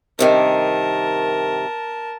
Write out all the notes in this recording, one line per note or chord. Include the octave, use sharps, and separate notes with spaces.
G2 C3 D#3 A#4 A5